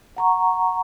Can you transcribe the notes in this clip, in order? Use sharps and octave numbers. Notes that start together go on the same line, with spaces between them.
F#5 A#5 C#6